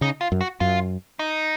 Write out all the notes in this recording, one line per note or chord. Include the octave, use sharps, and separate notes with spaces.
C#3 D#4
F4
F#2
F#4
F#2 F4
D#4